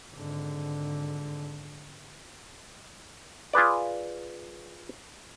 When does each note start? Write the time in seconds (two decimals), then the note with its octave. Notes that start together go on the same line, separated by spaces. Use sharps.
0.15 G#1 D3
3.53 F4 G#4 B4 D5